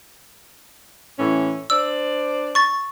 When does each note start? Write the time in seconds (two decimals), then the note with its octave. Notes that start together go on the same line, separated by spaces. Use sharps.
1.17 A2 E3 C#4
1.70 D4 C5 D5 E6
2.55 C#6 A6